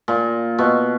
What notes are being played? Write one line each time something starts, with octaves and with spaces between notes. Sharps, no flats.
A#2
B2